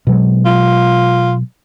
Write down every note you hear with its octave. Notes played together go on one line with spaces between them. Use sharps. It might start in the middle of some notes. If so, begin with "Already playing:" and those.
B2 F#3 G#3
F4